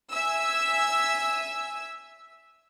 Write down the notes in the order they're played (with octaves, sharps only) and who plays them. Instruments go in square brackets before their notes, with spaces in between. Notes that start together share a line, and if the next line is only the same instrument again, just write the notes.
[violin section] E5 G#5 E6